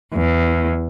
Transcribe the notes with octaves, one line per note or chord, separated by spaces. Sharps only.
E2